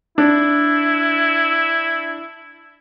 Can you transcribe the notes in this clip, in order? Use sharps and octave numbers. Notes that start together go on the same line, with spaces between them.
D4 E4